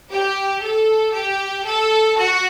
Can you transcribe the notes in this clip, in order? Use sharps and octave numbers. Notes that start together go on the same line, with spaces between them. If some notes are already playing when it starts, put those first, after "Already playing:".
G4
A4
G4
A4
F#4